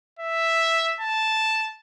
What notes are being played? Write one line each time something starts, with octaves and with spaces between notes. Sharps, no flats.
E5
A5